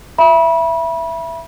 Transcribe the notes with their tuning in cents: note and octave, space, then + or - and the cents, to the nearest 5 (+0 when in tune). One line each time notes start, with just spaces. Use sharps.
E5 +15 B5 -30